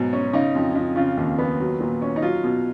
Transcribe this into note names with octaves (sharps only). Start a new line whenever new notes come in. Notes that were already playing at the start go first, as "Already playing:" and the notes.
Already playing: G#2 B2 F#3
C#4
C#3 D#4
F2
F2
C#3 F4
D#2
B3
F#3
A#2
C#4
D#4
F#3 F4
B2